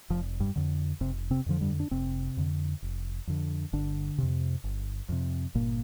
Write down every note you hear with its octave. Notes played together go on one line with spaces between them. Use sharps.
F1 F3
G2 G3
F2 D3
F1 C3 C4
C3 C4
F2 D3 F3
G2 G3
D4
F1 C3 C4
F2 D3
F1
F2 D3
G1 D3 D4
F2 C3
G1
F2 C3
G1 A#2 A#3